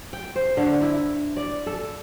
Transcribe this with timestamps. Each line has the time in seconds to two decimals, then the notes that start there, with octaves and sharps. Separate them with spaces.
0.13 G5
0.36 C5
0.57 D3
0.82 E4
1.37 D5
1.66 A4